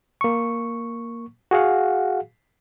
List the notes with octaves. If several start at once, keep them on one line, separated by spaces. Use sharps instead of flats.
A#3 C#6
F#4 G#4 F5 F#5